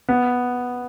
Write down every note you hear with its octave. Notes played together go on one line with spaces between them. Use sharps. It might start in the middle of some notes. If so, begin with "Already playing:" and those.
B3